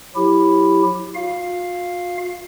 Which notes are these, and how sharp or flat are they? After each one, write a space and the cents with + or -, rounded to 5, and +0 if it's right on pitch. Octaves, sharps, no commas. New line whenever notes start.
F#3 -30 E4 +0 G4 +0
F4 +45 F5 +0